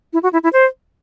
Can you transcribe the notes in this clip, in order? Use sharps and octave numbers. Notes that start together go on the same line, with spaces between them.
E4
F#4
E4
E4
C5